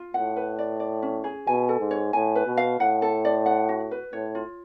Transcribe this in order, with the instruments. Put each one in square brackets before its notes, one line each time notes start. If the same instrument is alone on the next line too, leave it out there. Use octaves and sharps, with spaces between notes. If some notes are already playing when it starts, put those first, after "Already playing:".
Already playing: [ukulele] F4
[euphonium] A2 [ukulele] F#5
[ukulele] B4
D5
D5
C#4
G#4
[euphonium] B2 [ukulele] G#5
[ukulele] A4
[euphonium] G#2
[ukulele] C#5
[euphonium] A2 [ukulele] G#5
[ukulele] B4
[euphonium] B2
[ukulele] F5
[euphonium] A2 [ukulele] F#5
[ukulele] A4
D5
F#5
F#4
B4
[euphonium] A2 [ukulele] C#5
[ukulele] F4